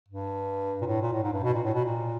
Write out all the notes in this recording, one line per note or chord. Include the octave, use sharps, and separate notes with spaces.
G2
A#2
A2
A#2
A2
G#2
G2
B2
A#2
A2
B2
A#2